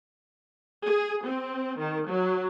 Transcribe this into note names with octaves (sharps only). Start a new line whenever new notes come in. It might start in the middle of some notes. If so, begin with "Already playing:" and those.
G#4
C4
D#3
F#3